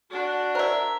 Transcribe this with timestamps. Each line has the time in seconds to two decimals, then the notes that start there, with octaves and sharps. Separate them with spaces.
0.11 D4 F#4
0.55 A#4 C5 D5 E5